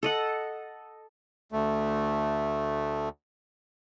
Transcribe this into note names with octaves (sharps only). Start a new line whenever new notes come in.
A4 D#5 F#5
D2 A3